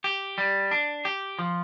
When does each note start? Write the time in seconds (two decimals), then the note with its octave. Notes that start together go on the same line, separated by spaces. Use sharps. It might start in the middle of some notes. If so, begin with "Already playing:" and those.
0.04 G4
0.38 G3
0.71 D4
1.05 G4
1.39 F3